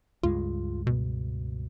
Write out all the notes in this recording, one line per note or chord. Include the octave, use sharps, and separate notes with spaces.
C#2 G2 G#3 F4
B2